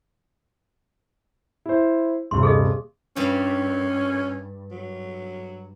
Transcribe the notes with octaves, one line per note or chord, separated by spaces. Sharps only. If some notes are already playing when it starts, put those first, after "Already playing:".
E4 C5
D#1 G2 C3 C6
G#4 A4 D#5
G2 C#4 G4
F#3